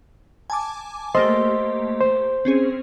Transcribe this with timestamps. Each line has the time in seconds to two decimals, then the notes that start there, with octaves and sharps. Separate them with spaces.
0.50 G#5 A5 D6
1.15 A3 A#3 G4 C5 D#5 C6
2.00 C5
2.45 C4 C#4 G#4